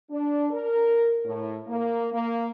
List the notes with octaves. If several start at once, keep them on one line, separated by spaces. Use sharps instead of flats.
D4
A#4
A2
A#3
A#3